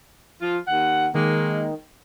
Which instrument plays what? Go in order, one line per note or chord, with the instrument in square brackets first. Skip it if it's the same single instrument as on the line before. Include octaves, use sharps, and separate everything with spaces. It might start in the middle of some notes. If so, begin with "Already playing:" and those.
[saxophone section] F3 F4
D#2 F#5
[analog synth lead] D#3 [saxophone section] G#3 A#3